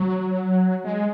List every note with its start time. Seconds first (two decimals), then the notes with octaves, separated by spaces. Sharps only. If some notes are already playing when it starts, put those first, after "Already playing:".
Already playing: F#3
0.84 G#3